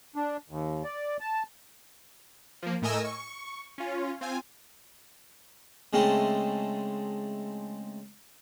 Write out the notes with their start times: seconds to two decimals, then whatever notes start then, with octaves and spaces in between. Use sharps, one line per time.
0.16 D4
0.50 D#2
0.84 D5
1.20 A5
2.62 F3 A#3
2.82 A2 A3 A#4 D#5 G#5 E6
3.05 C#6
3.78 C#4 F4
4.21 C4 F4 G#5
5.93 C#3 G#3 A3 C4 E4